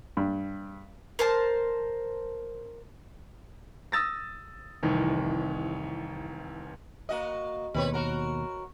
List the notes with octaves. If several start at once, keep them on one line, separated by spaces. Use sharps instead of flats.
G2
A#4 C5 A5
D#6 E6 A6 A#6
F1 C2 D#3 E3
A#3 F#4 D#5
D#2 B2 C4 B4 C#5
F#4 A#4